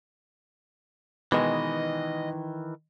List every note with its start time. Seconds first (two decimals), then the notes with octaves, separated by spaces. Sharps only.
1.32 B2 D#3 E3 G#3 D#5